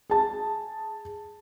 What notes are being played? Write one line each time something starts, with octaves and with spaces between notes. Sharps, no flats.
G#4 A5